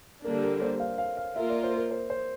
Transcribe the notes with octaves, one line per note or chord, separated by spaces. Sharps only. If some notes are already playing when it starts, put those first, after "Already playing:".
D3 G3 A#3 D4 A#4
A#4
C5
F5
F5
F5
A#3 F4 A#4 E5
D5
C5
A#4
C5
C5